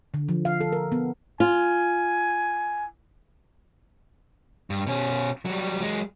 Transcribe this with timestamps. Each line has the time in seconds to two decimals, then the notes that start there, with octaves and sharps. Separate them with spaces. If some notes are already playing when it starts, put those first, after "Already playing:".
0.14 D3
0.29 F3
0.45 F5
0.61 A4
0.72 A#4
0.92 B3
1.40 F4 G#5
4.70 G2
4.87 B2 C#4
5.45 F#3 G3
5.81 F#3 G#3